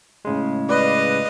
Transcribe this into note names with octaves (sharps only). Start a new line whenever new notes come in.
A2 C#3 G#3
B4 D5 D#5 F5